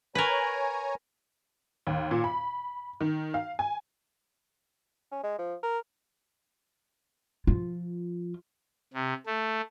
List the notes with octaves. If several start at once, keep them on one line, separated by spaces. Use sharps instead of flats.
A#4 B4 C#5 G#5 A#5
D#2
A#2
B5
D#3
F5
G#5
C#4
G#3
F3
A#4
F3 F4
C3
A3